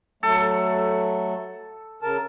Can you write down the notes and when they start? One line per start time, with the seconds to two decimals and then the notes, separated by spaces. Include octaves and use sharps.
0.23 F#3 A3 A4
2.02 C#3 A#4 A5